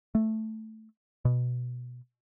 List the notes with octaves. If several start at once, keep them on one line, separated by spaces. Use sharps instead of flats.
A3
B2